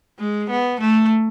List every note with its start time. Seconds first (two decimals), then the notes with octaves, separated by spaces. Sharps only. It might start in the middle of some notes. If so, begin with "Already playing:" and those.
0.19 G#3
0.50 B3
0.80 A3